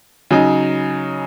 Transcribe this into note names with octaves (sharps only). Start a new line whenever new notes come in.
C#3 F#3 D#4